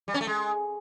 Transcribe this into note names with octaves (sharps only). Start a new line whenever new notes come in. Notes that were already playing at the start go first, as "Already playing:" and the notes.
G3
C#4
A3
G#3